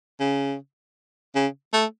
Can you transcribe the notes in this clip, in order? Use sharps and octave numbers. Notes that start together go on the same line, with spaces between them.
C#3
C#3
A3